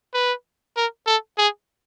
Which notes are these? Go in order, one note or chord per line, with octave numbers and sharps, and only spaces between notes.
B4
A#4
A4
G#4